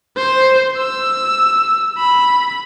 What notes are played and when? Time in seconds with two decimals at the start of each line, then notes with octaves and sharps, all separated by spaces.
0.17 C5
0.78 E6
1.98 B5